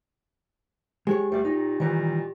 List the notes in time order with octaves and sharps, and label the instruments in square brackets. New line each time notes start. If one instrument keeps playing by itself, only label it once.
[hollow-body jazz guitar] G#3 G#4 C#5 [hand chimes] G4
[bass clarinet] D2 [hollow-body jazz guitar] G3 D5
[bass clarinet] A#2 [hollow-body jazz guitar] D#4
[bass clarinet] A#2 [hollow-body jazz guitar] D#3 E3 G3